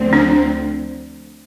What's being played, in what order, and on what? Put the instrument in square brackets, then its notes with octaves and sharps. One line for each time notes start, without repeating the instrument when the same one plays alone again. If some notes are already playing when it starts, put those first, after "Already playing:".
Already playing: [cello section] D2 D3 F3 C4
[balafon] D4